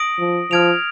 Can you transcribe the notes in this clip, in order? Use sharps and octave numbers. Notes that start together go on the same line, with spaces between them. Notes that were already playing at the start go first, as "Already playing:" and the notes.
Already playing: D#6 A#6 D7 F#7
F3
F3 F6 G#6 D7 F7